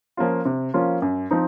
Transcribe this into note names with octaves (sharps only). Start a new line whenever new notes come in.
F3 A#3 C#4 F4
C3
F3 A#3 C#4 F4
F#2
F3 C4 D#4